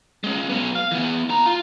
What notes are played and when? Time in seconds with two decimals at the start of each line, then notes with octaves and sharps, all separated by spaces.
0.24 G#3 C#4
0.49 F#3 B3
0.75 F5
0.91 E3 B3
1.29 E4 A#5
1.46 F4